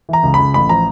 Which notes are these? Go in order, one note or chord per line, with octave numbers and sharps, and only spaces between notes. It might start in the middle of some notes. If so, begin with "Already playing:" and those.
E3 A#5
C#2
C#2 B5
A1 B5
F3 A#5